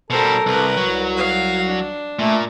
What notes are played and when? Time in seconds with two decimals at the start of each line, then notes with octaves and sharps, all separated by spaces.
0.10 B2 G3 A4 A#4 C5
0.46 C2 A#4 B4
0.77 C2 F#3
1.16 F5
1.67 D4
2.19 A#2 A3